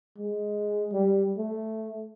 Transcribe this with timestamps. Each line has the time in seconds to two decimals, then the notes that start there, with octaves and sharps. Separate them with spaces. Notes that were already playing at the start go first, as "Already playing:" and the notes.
0.18 G#3
0.93 G3
1.38 A3